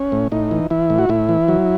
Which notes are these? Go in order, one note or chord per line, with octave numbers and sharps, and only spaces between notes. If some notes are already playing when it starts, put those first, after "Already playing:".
Already playing: C#4
A2
A2 D#4
E3
E3 E4
A2
F#4
A2 E4
E3
F#3